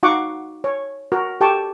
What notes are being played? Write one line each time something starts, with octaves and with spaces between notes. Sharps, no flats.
D#4 F#4 F5 F#5 C#6 D6
C#5
F#4 A#4
G4 A4 G5 A5 C#6